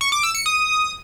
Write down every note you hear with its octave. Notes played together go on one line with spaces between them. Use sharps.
C#6
D6
E6
C#7
D#6